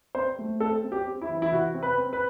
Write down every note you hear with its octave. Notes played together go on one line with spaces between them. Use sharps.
C4 C5
A3
C4 A4
C4
G4
C4
E4
E3
E4
C3 F#4
C4
B4
C4
B4